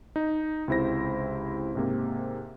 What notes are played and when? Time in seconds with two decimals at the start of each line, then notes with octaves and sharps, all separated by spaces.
0.16 D#4
0.68 C#2 C3 E4 C5 A#6
1.75 G#2 C3 A#3